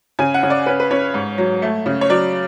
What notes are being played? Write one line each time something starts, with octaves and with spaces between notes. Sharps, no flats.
C#3 G#5
F#5
C#3
D5
C#4 B4
B4
C#4 C#5
G#2
F#3
A3
C#3
C#5
F#3 D5